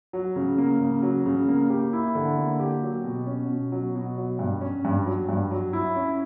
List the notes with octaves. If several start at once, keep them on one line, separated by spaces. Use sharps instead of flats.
F#3
C#3
A#3
C#3
F#3
C#3
A#3
G4
E4
D3
A#3
G4
F#3
B2
C#4
B2
F#3
B2
F#3
G2
C#4
G2
F#3
G2
F#3
E4
C#4